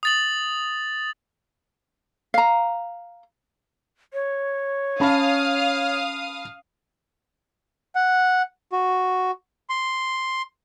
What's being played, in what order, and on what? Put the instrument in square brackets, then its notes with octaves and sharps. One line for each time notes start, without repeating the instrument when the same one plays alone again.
[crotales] D#6 A6 F#7
[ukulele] F5 A#5
[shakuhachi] C#5
[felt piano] C#4 A5 B5 [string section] F5 D#6
[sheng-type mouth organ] F#5
F#4
C6